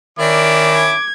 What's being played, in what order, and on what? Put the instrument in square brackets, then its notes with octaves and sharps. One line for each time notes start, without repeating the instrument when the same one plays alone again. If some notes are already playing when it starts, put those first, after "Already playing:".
[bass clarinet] D#3 [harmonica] C#4 E4 [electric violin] A#4 D5 [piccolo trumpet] D6
[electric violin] G#6